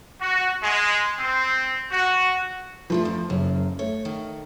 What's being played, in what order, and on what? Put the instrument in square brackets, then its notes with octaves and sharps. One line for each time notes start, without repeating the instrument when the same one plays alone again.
[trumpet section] F#4
G#3
C4
F#4
[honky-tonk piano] F3 A3 C6 [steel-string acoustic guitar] D4 A4 B4
[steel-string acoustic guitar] F2
[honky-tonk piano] F#1 C#3 [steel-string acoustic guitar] F#2
[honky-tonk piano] A3 [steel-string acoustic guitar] C#5
[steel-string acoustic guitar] D#3